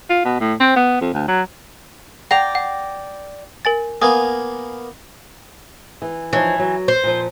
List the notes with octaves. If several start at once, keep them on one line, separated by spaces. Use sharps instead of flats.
F4
B2
A2
C4
B3
F2
D2
F#3
D5 F#5 G5 A#5 F7
F#5
A#4 G#5 A6
A#3 B3 F5 G#5 D#6
E3
E3 F3 D#4 C#5
F#3
C5
A#2 F3